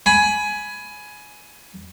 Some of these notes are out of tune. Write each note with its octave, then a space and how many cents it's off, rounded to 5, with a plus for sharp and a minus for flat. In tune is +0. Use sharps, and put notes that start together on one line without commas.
G#5 +15 B5 +0